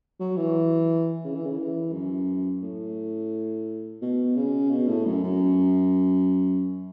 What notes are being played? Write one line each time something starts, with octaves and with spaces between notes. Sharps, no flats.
F#3
E3
C#3
E3
C#3
E3
F#2
A2
B2
C#3
B2
A2
F#2
F#2